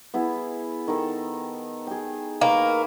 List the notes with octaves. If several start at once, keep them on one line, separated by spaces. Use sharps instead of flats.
B3 E4 G#4
D#3 A4
G#4 G5
D#3 A#3 B4